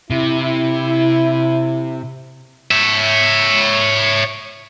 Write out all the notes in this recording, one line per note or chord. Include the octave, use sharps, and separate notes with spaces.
C3 E4
C#5 E5